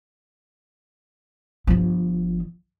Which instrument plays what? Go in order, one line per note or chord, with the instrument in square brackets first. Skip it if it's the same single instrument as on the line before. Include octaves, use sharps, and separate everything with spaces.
[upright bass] G1 F3